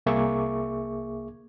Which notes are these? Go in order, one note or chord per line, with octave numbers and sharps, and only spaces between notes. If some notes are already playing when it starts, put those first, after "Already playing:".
C2 A#3 G#4 E5 C#6 D6